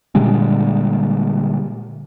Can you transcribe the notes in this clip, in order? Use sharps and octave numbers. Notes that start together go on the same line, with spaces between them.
A#2 D3 G3 G#3